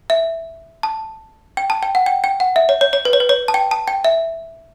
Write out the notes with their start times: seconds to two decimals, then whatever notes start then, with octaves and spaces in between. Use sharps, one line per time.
0.10 E5
0.83 A5
1.57 G5
1.70 A5
1.83 G5
1.95 F#5
2.06 G5
2.24 G5
2.40 F#5
2.56 E5
2.69 C#5
2.81 C#5
2.93 C#5
3.05 B4
3.13 C#5
3.20 B4
3.29 C#5
3.48 A5
3.54 G5
3.71 A5
3.88 G5
4.05 E5